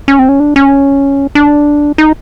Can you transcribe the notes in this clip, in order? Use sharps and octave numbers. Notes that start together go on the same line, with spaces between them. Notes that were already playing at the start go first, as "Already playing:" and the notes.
C#4
C4
C#4
D4
C#4
D4
D#4